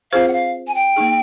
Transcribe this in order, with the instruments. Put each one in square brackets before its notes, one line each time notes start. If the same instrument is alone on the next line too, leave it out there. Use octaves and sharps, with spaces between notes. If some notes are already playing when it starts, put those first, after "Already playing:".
[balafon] C4 F4 G#4 C5 [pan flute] F5
[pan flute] F#5
F5
G#5
G5
[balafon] A#3 D#4 G#4